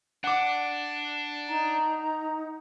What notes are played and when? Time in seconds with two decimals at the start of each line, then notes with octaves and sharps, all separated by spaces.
0.24 D4 F#5 D6
1.49 D#4 A#5